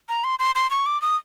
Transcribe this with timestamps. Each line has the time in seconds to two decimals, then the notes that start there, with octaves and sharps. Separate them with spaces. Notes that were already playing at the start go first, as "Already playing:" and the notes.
0.09 A#5
0.24 C6
0.39 C6
0.55 C6
0.71 C#6
0.86 D6
1.02 D#6